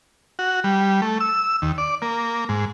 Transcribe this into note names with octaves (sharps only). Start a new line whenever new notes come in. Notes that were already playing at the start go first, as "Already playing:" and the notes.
F#4
G3
A3
E6
D#2
D5
A#3
G#2